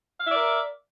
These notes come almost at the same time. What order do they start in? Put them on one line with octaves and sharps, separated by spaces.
F5 E5 D5 A#4